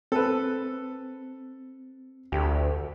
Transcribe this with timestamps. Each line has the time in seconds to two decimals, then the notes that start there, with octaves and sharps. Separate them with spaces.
0.12 C4 A4 B4
2.32 D2 G4